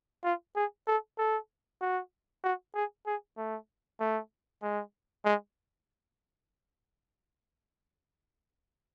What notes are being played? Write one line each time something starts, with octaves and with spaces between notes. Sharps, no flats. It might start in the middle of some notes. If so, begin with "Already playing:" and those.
F4
G#4
A4
A4
F#4
F#4
G#4
G#4
A3
A3
G#3
G#3